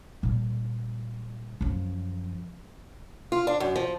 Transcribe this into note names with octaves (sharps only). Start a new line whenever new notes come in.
A#2 G3
F#2 F3
F4
D4
F#2
F3